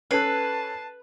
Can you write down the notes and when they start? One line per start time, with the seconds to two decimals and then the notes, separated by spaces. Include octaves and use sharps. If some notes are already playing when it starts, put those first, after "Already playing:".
0.11 C#4 A4 B4 A5 F#6 C7